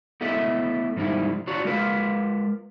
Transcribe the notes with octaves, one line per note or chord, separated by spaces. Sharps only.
A3 B3 E4 A4 D#5 E5
G#2 F3 G3 D#4 E4
D4 F4 F#4 C#5
G#3 F4 A#4 B4 F5